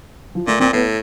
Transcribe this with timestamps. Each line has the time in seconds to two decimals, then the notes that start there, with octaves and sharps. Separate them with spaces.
0.35 F3
0.47 A#2 A3
0.60 A#2 C4
0.73 A2 B3